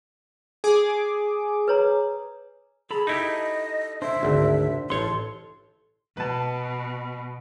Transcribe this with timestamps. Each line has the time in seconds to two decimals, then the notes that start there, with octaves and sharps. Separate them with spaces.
0.64 G#4 D6
1.68 B4 C#5 A#5
2.91 G#4 A4 A#5 B5
3.07 D#4 E4 G4 D#5
4.02 D4 C5 E5
4.23 G#1 D2
4.90 A1 A4 C#5 C6
6.17 B2 B4 A5